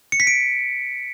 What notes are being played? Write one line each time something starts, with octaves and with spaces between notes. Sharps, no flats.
C#7
B6
D7